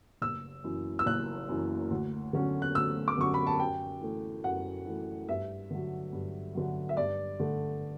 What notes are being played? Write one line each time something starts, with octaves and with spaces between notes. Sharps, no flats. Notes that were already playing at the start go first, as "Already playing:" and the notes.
F#1 E6
F#2 E3
E6
F#1 F#6
F#2 E3
D2
D3 F#3 C#4
F#6
D2 E6
D6
D3 F#3 C#4 C#6
B5
A5
F#2 G5
E3 A3
F#2 F#5
E3 A3
G2 E5
D3 F#3
G2
D3 F#3
E5
G2 D5
D3 A3